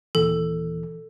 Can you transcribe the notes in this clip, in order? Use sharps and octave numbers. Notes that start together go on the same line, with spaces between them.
D#2 A#2 E3 A4